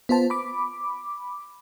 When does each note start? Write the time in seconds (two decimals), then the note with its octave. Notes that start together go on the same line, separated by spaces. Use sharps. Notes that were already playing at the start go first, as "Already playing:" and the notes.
0.09 B3 F4 C5 A5
0.30 B5 D6